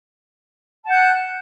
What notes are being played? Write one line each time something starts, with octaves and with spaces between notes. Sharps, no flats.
F#5 A5 F#6 G6